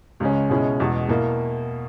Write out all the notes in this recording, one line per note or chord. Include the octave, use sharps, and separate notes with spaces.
C#2 C#3 G#3 C#4
B2 G#3 C#4 E4
E2 B2 G#3
B2 A#3 E4